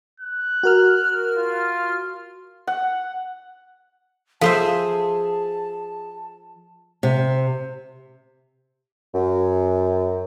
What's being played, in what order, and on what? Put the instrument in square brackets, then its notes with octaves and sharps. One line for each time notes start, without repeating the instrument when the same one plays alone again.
[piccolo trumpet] F#6
[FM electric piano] F#4 A#4 F6
[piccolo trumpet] F4
[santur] F#5
[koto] F3 C5 E5 [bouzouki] G#4 [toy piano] A4 F5 [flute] A5
[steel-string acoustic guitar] C3
[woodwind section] F#2